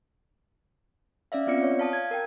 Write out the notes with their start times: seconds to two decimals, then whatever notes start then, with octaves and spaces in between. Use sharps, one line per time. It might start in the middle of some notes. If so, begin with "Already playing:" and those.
1.32 C#4 D5 E5 F5
1.47 B3 C4 F4 D5 C#7
1.63 C#5
1.79 F5 A5 D#6
1.93 G#6
2.11 A#4 G5